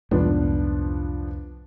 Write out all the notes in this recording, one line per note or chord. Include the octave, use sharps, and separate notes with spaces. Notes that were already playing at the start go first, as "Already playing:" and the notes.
C2 F2 G#2 F3 B3 D4